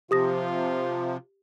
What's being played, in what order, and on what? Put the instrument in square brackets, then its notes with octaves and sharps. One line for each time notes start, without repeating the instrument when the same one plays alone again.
[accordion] C3 F3 [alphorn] F4 [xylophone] G4 D#6 A#6